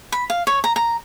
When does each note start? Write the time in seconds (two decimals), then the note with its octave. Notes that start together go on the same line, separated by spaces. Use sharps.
0.12 B5
0.30 F5
0.47 C#5
0.64 A#5
0.76 A#5